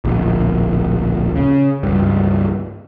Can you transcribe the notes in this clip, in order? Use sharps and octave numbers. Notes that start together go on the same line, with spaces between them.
D1 A#1
C#3
C#2 G2